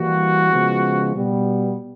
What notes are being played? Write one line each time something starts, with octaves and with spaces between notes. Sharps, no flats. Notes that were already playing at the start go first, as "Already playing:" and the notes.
Already playing: E3 G3 A#3 F#4
C#3 F3 G#3 B3
B2 G3 B3